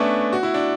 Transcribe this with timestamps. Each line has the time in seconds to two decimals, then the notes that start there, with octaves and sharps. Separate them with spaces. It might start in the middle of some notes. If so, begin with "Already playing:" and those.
Already playing: A3 B3 C#4 D4
0.33 F#4
0.43 E4
0.54 D4